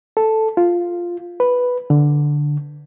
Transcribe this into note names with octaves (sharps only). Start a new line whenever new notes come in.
A4
F4
B4
D3